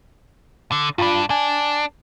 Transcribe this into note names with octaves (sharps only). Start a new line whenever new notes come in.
D3
G2 D4 F4 A5 B5
D4 G#5